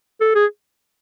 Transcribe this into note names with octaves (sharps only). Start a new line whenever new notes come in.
A4
G#4